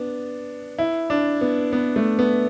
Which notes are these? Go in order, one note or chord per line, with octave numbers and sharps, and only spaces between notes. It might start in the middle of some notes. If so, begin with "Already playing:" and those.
Already playing: B3 D4
E4
D4
B3
B3
A3
B3